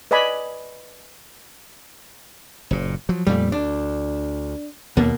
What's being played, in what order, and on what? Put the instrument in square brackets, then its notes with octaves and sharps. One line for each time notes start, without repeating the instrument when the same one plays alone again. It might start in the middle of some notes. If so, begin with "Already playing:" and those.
[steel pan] B4 D5 D#5 G#5 B5
[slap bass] F#1 A#2
F3 F#3
[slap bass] F2 A#2 A3 [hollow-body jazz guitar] G3
[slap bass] D2 [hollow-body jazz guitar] D4
[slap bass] D#2 [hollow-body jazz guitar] B2 A#3